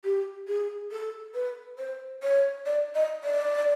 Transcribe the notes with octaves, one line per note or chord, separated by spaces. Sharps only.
G4
G#4
A4
B4
C5
C#5
D5
D#5
D5